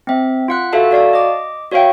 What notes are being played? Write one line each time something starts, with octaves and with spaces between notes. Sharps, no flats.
C4 E5
F4 F#5 F#6
F#4 A4 E5 F5 A5
F#4 D5 F5 A5
D#5 D6
F#4 C#5 E5 F5 G5